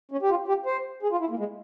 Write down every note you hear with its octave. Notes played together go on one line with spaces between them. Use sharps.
C#4
G4
F4
G4
C5
G#4
F4
E4
A#3
G#3